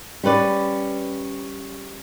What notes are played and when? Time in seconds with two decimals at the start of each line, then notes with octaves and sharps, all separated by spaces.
0.24 G3 C#4 B4 D5